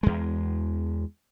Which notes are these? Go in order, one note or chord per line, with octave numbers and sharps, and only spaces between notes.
E2 G#3